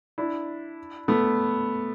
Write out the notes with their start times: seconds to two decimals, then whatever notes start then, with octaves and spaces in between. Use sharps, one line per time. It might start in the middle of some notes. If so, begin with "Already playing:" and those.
0.18 D4 E4
1.08 A3 B3